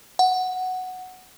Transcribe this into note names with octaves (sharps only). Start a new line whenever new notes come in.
F#5